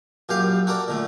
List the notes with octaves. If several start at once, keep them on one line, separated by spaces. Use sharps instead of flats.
A#1 F#2 G4 F5
F#4 A4 A#4 D5
A#2 D3 A3